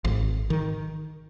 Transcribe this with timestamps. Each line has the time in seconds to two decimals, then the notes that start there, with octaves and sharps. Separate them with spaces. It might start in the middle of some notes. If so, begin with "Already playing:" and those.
0.05 G#1
0.50 D#3